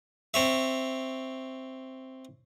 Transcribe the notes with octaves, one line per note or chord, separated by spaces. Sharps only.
C4 C#5 E5